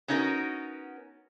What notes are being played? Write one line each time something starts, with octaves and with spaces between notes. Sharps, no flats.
B3 C#4 D#4 F#4 G4 A#4